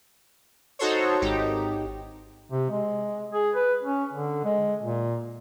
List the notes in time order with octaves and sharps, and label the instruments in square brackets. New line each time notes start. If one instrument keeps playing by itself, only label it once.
[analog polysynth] D#4 F#4 A4 C5 C#5
G#1 D#4 G4
[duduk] C3
G#3
G#4
B4
C#4
D3
G#3
A#2